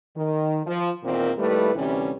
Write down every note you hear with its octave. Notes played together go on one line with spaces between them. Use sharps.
D#3
F3
E2 A#2 D#3 A#3 C4
D#2 G3 A3 E4 B4
D2 C3 E3 G3 C#4